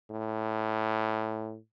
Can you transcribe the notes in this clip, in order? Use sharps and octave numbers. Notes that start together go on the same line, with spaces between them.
A2